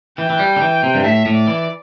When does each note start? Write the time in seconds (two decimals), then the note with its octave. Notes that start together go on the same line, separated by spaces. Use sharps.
0.18 E3 G5
0.30 E3
0.39 G3
0.56 D3
0.61 E3
0.83 C3
0.95 G2
1.04 A2 E5
1.26 A2
1.34 D5
1.48 E3